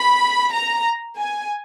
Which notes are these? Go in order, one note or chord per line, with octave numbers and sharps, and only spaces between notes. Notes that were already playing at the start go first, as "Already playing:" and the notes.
Already playing: B5
A#5
G#5